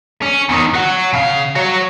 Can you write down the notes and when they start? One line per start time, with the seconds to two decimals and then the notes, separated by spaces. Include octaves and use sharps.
0.22 C#4
0.49 E2 D#3
0.74 F#3 F#4
1.13 C#3 F5
1.56 F#4 C#5